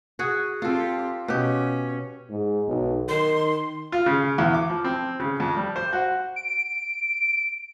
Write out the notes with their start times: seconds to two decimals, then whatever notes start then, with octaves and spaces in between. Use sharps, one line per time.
0.19 F#4 G#4
0.62 C4 F4 G4 A4
1.28 B2 C#4 G4
2.30 G#2
2.68 B1
3.09 D#3 C6
3.92 F4
4.06 C#3
4.38 E2
4.54 D6
4.69 F3
4.84 C4
5.20 C#3
5.40 F2
5.57 G3
5.76 C5
5.93 F#4
6.36 D7